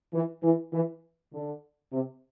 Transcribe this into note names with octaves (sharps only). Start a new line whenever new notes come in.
E3
E3
E3
D3
C3